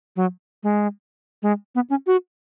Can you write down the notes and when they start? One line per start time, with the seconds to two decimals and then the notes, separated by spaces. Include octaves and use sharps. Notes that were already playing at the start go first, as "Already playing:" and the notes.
0.16 F#3
0.63 G#3
1.42 G#3
1.75 B3
1.90 C#4
2.07 F#4